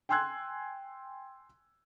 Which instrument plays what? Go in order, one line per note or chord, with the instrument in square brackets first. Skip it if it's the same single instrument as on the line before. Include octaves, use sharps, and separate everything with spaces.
[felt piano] G5 G#5 C6 E6 F#6 G#6